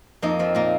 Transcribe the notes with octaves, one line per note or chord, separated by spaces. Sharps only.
F2 A#3 D#4
F3 C4
A#2 A#3